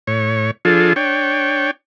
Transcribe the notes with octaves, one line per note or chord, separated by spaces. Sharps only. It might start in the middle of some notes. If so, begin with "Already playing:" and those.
A2 C#5
F3 D4 F4 G#4 A4
D4 C#5 G5